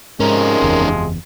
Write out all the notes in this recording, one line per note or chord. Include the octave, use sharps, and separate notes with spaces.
G#2 C3 F3 G#3 C#4 D#4 A#4
F#1 E2